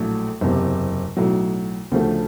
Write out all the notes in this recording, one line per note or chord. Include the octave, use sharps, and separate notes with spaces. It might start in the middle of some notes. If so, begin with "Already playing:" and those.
Already playing: A#1 A2 F#3 A3
F#1 E2 C3
B1 A2 F#3
D2 C#3 F3 A3